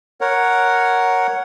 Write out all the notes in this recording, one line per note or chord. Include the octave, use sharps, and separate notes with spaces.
A#4 C#5 F#5